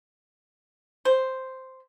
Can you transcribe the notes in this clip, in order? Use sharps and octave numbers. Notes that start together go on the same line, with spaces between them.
C5